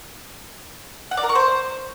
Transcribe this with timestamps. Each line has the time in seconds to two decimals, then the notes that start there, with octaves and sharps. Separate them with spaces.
1.11 F#5
1.17 D5
1.23 A#4
1.29 C#6
1.35 C5